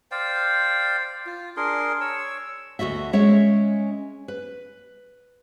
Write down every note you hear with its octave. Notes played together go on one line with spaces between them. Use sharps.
C5 D5 F5 G5
F4
D4 G#4 A#4 C6
C#5 E6
D2 D#3 F#4 D#5 E5
G#3 C#4 C#5 E5
B4